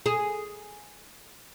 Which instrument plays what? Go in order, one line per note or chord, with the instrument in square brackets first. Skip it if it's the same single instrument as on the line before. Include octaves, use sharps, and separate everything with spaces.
[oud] G#4